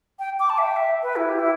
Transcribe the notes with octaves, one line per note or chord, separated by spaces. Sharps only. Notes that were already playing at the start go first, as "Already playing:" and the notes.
G5
D6
A5
E5
G5
E5
B4
E4
G4
E4